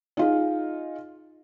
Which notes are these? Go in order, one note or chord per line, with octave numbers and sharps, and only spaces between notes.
D#4 F4 G#4